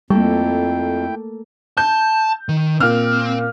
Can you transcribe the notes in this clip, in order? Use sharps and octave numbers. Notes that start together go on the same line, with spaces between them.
F2 G3 A3 A#3 E4 A4 G5
A5 G6
D#3
A#2 C4 F6